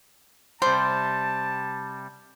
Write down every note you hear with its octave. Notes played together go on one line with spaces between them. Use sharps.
C3 G3 C5 A5